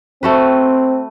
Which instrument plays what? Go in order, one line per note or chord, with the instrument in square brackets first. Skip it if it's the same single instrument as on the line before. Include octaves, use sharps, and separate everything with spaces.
[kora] A3 F#4 B4 [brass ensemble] C4